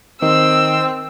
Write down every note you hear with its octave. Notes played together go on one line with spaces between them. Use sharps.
D#3 C4 E6